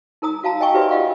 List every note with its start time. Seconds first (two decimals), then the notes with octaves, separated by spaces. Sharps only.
0.22 D#4 A#4 A#5 D#6
0.43 F#4 F5 A5 A#5
0.61 D#5 G5 G#5 C#6
0.74 F#4 G4 B4 C5 D5 E5
0.91 F4 G4 D#5 F5 F#5